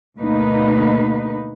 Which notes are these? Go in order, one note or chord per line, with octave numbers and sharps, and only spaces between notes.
D2 B2 A#3 D#4 B4